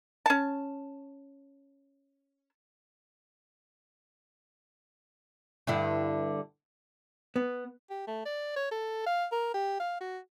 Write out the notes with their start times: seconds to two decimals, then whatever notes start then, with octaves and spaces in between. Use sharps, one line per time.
0.26 C#4 A5
5.67 G2 D3 E4
7.36 B3
7.90 G4
8.07 A3
8.26 D5
8.56 C#5
8.71 A4
9.06 F5
9.32 A#4
9.54 G4
9.80 F5
10.01 F#4